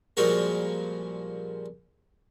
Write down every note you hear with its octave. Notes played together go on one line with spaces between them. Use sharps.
A#2 F3 G3 G#3 F#4 A#4